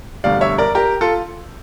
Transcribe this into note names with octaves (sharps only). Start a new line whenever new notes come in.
E1 D2 D3 G3 D5 F5
C#5 E5
A#4 D5
G4 A#4
F4 A4